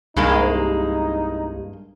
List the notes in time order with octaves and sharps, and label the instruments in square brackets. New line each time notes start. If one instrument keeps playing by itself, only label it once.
[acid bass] C2 [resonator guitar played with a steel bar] G2 G#3 A#3 [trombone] D#4